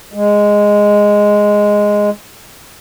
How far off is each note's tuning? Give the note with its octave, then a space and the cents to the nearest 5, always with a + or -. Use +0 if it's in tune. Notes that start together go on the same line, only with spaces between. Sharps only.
G#3 -5